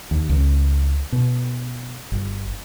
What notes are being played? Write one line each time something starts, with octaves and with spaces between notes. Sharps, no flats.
D#2
C#2
B2
G1